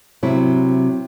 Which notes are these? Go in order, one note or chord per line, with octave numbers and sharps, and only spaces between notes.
C3 F#3 E4